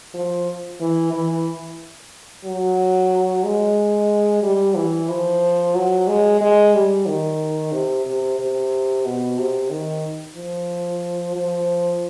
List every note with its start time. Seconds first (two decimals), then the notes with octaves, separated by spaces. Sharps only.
0.14 F3
0.80 E3
1.13 E3
2.45 F#3
3.44 G#3
4.43 G3
4.76 E3
5.09 F3
5.75 F#3
6.08 G#3
6.41 G#3
6.74 G3
7.07 D#3
7.72 C3
8.06 C3
8.39 C3
9.05 B2
9.38 C3
9.70 D#3
10.36 F3
11.36 F3